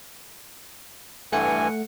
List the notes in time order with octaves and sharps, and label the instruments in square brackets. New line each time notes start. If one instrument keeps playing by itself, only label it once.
[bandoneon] G2 E3 G#5 [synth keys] A3 F#5 C#7